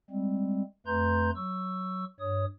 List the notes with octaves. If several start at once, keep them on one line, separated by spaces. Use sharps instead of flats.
G3 G#3 C4
F2 A3 B4 A#5 C6 G6
F#3 C#6 E6
G2 C#5 D#6